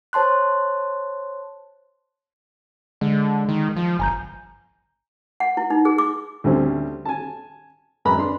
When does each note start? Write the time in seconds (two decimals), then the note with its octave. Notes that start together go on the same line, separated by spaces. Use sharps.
0.13 C5 C#5 A5 C6 F#6
3.01 D3 G#3
3.49 D#3
3.76 F3
3.99 G1 G#5 A#5 G6
5.40 F#5
5.57 E4
5.70 D#4
5.85 G#4
5.98 D6
6.44 D2 D3 G3 A3 C4 C#4
7.05 G#5 A5
8.05 F#2 G#3 B4 A#5 B5
8.17 D4 C6